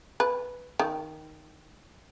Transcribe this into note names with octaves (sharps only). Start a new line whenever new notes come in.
B4
D#3